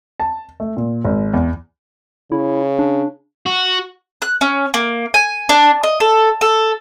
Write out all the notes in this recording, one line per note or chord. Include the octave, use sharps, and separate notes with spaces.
A5
A3
A#2
G#1
E2
C#3 E4
D4
F#4
F#6
C#4
A#3
G#5
D4
D#5
A4
A4